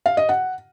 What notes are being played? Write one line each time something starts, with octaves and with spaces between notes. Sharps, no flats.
F5
D#5
F#5